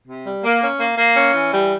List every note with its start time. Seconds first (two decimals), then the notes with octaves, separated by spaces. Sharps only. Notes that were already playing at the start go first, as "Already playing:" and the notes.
0.07 C3
0.25 G3
0.44 A#3
0.62 C#4
0.79 A#3
0.98 A#3
1.16 C#4
1.34 E3
1.51 G3